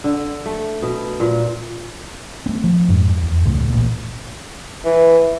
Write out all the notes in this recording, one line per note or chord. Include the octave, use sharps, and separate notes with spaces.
D3
A3
B2
A#2
A3 C4
F3
F2 G#2
E2
C#2 A2 A3
A1 A#2
E3